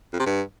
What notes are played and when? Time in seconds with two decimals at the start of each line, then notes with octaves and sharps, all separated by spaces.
0.13 F2
0.19 C3
0.26 G2